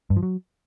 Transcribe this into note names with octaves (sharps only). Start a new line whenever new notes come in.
G2
F3
F#3